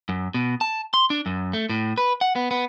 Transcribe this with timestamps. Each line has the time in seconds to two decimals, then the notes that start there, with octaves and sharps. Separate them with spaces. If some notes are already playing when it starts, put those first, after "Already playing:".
0.09 F#2
0.34 B2
0.61 A5
0.94 C6
1.10 D4
1.26 F#2
1.53 A3
1.69 A2
1.98 B4
2.21 F#5
2.36 B3
2.51 B3